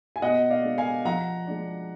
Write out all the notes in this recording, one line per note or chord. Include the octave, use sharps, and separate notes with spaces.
G#5
B2 D#5 F#5
D5 F5
G#3 D4
F5 G#5
F3 F#5 A#5
G#3 D4